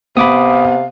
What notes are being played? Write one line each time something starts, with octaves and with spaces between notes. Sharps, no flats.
C3 B3 F5 B5 D6 D#6